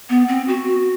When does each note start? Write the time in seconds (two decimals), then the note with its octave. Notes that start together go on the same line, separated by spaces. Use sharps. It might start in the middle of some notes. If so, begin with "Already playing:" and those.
0.10 B3
0.28 C4
0.48 F#4